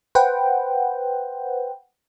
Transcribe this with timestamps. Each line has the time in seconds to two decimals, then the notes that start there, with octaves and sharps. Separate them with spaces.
0.15 B4 C5 F#5 G5